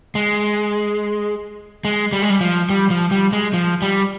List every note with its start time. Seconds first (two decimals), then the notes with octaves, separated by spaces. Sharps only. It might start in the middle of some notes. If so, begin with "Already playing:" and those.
0.15 G#3
1.85 G#3
2.12 G3
2.22 G#3
2.30 G3
2.41 F3
2.70 G3
2.90 F3
3.11 G3
3.33 G#3
3.53 F3
3.82 G3